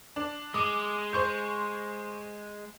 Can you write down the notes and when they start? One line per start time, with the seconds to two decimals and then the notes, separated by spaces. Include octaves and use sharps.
0.16 D4
0.54 G#3 D6 D#6
1.13 C5 C#6 G6